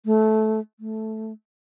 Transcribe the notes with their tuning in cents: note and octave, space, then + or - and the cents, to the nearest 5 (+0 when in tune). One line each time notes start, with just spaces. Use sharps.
A3 -15
A3 -5